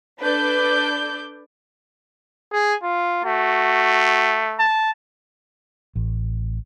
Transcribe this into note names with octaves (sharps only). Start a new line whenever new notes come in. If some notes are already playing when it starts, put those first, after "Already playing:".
D4 A4 B4 D5 D6 G6
G#4
F4
A3 F#4
A5
A1